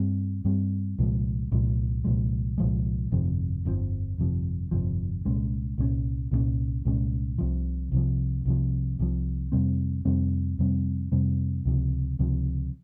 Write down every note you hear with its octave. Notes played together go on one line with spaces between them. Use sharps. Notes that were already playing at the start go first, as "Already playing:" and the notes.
Already playing: G2 G3 C4
G2 G3 C4
C2 A#2 F3 G#3
C2 A#2 F3 G#3
C2 A#2 F3 G#3
C2 A#2 F3 G#3
G1 F2 C3 F3
G1 F2 C3 F3
G1 F2 C3 F3
G1 F2 C3 F3
C2 A#2 G#3 C#4
C2 A#2 G#3 C#4
C2 A#2 G#3 C#4
C2 A#2 G#3 C#4
C2 C3 F3
C2 C3 F3
C2 C3 F3
C2 C3 F3
F2 C3 G3 C4
F2 C3 G3 C4
F2 C3 G3 C4
F2 C3 G3 C4
C#2 C3 F3
C#2 C3 F3